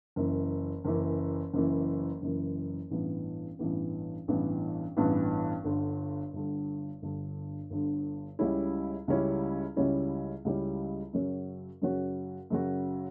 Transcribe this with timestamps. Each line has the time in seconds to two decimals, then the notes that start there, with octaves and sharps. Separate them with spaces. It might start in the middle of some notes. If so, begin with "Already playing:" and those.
0.16 F#1 F#2 E3
0.85 F#1 F#2 E3
1.53 F#1 F#2 E3
2.22 F#1 F#2 E3
2.91 A1 G2 E3 B3
3.59 A1 G2 E3 B3
4.28 A1 G2 E3 B3
4.97 A1 G2 E3 B3
5.64 G1 G2 D3
6.33 G1 G2 D3
7.02 G1 G2 D3
7.70 G1 G2 D3
8.39 C#2 C#3 G3 C#4 E4
9.08 C#2 C#3 G3 C#4 E4
9.76 C#2 C#3 G3 C#4 E4
10.45 C#2 C#3 G3 C#4 E4
11.13 F#2 C#3 F#3 C#4 F#4
11.82 F#2 C#3 F#3 C#4 F#4
12.50 F#2 C#3 F#3 C#4 F#4